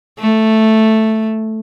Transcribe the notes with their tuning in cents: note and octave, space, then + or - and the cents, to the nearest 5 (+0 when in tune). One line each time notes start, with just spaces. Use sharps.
A3 +0